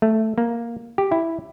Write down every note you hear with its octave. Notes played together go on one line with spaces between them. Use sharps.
A3
A#3
G4
E4